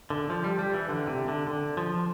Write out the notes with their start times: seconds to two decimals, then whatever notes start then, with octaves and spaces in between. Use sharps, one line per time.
0.10 D3
0.30 F3
0.44 G3
0.59 G3
0.74 E3
0.89 D3
1.07 C3
1.28 D3
1.48 D3
1.77 F3